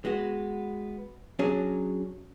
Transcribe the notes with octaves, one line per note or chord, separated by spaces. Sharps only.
G#3 B3 F#4
F#3 C#4 D4 G#4